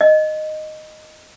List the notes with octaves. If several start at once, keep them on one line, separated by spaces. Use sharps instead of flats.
D#5